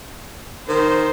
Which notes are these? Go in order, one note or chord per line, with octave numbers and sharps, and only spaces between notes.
D#3 C5